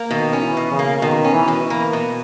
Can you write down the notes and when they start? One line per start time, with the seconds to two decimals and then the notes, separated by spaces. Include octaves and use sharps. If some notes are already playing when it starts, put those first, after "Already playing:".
Already playing: A#3
0.11 B2 D#3
0.33 C#4
0.41 E3
0.57 B2
0.72 C#3
0.79 A#3
1.02 B2 D#3
1.24 C#4
1.33 E3
1.48 B2
1.63 E3
1.70 A#3
1.93 B2